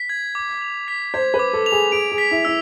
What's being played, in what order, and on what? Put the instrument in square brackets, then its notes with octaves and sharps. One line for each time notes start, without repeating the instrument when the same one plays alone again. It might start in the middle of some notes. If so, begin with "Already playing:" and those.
Already playing: [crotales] B6
G#6
D6
F7
B6
[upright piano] C5 [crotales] G#6
[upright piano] B4
[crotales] D6
[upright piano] A4
[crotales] F7
[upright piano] G#4
[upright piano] G#4 [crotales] D7
[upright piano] G#4
[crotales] B6
[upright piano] E4
[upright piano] E4 [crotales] E6